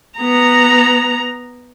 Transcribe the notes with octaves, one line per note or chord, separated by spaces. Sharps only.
B3 A#5